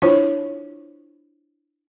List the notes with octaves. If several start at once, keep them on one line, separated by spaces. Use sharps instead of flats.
D4 E4 F4 C5 C#5